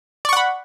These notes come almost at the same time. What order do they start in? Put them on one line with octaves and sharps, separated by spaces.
D5 C#6 F#5 B5